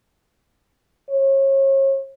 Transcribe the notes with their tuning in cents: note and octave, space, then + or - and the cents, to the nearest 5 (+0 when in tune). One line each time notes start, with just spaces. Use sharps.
C#5 -35